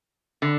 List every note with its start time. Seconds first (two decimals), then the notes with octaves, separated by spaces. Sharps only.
0.42 D3